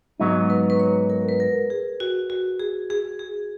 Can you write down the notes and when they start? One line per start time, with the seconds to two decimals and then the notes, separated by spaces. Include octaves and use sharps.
0.20 G#2 F#3 B3 D#4
0.50 B4
0.70 B4
0.79 C#5
1.10 A#4
1.29 B4
1.40 A#4
1.70 G#4
2.00 F#4
2.30 F#4
2.60 G#4
2.90 G#4
3.19 G#4